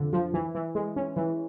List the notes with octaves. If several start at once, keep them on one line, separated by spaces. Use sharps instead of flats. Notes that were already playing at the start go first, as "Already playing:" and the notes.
Already playing: F2 D3 F3
F3
E3
E3
G#3
C#4
E3